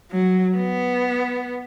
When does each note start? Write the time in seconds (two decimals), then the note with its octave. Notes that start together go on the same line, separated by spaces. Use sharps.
0.11 F#3
0.57 B3